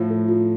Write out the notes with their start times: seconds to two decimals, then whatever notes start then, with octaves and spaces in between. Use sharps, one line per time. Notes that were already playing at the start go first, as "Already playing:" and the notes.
Already playing: A2 F3 F4 F5
0.10 A4
0.28 F4